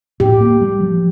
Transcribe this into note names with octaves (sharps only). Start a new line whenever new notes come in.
A2 G4
A#3
G3
F3